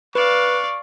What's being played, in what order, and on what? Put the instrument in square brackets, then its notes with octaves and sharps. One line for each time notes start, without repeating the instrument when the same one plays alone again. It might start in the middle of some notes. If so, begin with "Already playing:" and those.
[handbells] B4 [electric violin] D5 F5 [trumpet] C#6